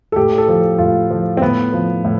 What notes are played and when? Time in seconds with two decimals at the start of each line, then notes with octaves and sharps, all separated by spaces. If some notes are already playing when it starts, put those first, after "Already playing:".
0.12 A4
0.16 A2 G4
0.38 A4
0.48 F3
0.78 A2 F4
1.11 F3
1.37 C4
1.42 A2 B3
1.73 F3
2.05 A2